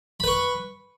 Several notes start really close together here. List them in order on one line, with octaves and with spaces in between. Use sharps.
B5 B4 C#6